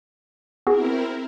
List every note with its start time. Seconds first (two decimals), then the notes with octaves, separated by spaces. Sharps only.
0.67 B3 C4 E4 F#4 G#4 A#4